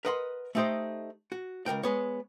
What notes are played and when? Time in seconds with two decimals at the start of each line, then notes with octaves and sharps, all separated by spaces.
0.05 A#4 B4 D#5 F#5 A5 C6
0.55 A3 B3 D#4 G4 C5 D#5
1.32 F#4
1.66 C#2 C3 A#4 G5
1.83 G#3 B3 C#5